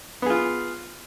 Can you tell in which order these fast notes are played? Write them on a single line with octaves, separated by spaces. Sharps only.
B3 G#4 F4